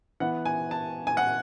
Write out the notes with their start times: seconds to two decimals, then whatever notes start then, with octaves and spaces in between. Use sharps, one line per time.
0.20 E3 B3 F#5
0.46 G#5
0.71 A5
1.07 G#5
1.17 F#5